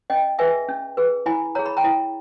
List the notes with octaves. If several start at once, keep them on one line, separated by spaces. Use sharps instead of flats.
C#4 D#5 G5
G#4 B4 E5 G#5
C#4
G#4 B4
E4 G#5 B5
G#4 C#5 A#5
B5
G5 A#5
E4